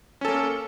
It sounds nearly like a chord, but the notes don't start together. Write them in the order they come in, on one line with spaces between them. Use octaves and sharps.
C#4 A4 A#3